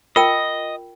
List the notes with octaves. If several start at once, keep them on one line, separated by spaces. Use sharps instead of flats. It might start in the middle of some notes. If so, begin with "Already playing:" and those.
F4 A#4 D#5 G5